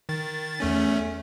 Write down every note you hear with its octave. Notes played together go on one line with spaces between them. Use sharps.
D#3 A6
E2 A3 C#4